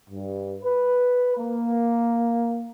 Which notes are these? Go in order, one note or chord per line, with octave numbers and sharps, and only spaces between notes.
G2
B4
A#3